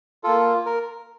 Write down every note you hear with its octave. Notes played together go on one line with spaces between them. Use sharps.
A#3 F4 A4
A#4